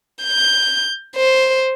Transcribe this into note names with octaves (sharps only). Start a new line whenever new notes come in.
G6
C5